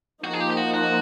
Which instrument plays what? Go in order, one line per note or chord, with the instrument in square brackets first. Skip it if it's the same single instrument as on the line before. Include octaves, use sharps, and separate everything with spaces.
[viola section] F3 A#3 D#4 [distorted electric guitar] F#4
[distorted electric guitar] G#4
G4
G4
F#4
F#4